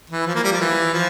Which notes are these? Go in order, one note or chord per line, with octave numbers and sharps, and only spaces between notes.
E3
F3
A#3
G3
F3
E3
F3